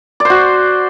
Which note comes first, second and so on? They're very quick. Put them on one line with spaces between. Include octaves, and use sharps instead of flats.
D5 C5 F#4